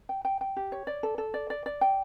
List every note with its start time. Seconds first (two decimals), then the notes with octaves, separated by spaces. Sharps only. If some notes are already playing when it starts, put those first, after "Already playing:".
0.09 G5
0.25 G5
0.41 G5
0.57 G4
0.72 C#5
0.87 D5
1.03 A4
1.18 A4
1.34 D5
1.50 D5
1.66 D5
1.81 G5